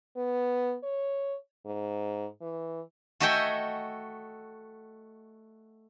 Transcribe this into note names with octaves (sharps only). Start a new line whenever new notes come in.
B3
C#5
G#2
E3
A3 F#4 D#5 E5 G5 G#5